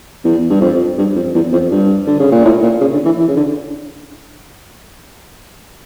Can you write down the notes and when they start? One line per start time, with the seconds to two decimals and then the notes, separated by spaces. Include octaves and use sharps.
0.24 E2
0.50 G2
0.61 F2
0.98 G2
1.16 F2
1.35 E2
1.52 F2
1.71 G2
2.07 D3
2.20 C#3
2.31 A#2
2.45 A2
2.62 A#2
2.81 C#3
2.93 D3
3.05 E3
3.18 E3
3.28 C#3
3.36 D3